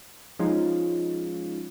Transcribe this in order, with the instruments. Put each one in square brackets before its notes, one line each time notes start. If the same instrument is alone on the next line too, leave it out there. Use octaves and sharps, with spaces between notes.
[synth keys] F3 G#3 C#4 D#4 F4